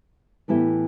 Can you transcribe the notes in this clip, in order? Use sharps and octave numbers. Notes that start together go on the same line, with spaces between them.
A2 E3 B3 E4 G4